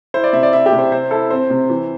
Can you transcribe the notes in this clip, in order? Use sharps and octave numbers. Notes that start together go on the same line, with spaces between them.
E4 C5
D5
C3 E5
D5
E4 E5
G4
C3
C5
C4 C5
E4 A4
C4 C5
C3
E3